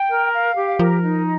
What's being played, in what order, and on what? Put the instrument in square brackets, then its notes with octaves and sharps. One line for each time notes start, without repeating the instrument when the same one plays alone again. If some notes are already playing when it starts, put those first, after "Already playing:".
Already playing: [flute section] G5
A#4
F5
G4
[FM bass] F3 [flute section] A#4
[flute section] D#4